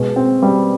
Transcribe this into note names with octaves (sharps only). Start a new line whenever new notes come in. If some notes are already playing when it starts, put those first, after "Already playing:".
Already playing: B2 G#3
C4
G3